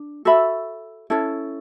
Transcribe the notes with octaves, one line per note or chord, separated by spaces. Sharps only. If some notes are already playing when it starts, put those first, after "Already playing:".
Already playing: D4
F#4 A4 E5 B5
C#4 E4 A4